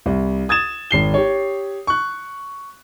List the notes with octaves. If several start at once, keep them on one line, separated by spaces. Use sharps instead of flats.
C2
D#6 G#6 A6 E7
G#1 C7 G7
G4 C#5
C#6 F#6